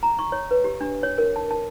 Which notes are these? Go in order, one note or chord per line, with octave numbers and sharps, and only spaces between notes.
A#5
C#6
C#5
B4
G4
D4
C#5
A#4
A5
A5